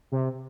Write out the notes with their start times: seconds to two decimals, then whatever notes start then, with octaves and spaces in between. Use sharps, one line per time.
0.12 C3